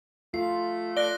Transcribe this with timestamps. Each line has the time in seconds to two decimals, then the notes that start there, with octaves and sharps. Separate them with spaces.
0.34 A3 F4 C7
0.97 D5 F#6 A#6 G7